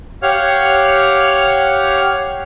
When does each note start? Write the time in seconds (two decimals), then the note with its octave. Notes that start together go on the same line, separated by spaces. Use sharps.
0.23 G4 C#5 F5 F#5 F6